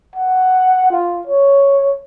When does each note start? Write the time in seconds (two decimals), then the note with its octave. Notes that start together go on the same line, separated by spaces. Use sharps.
0.16 F#5
0.91 F4
1.27 C#5